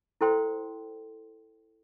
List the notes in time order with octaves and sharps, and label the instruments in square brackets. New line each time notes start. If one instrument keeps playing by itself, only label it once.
[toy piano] E4 A4 C5 G5 C6